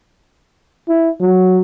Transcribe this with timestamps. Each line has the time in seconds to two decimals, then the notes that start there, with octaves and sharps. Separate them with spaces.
0.88 E4
1.20 F#3